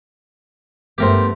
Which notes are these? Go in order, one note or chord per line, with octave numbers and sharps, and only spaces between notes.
G2 A3 B3 G4 A#4 C5